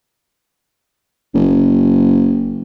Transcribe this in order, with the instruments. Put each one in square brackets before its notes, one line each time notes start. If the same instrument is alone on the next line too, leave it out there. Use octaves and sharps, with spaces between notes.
[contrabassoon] F#1